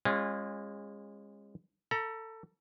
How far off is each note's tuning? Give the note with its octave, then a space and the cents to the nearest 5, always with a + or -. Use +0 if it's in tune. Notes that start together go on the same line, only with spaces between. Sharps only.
G#3 -25 C#4 -35 F4 +0
A4 +20 A#5 +40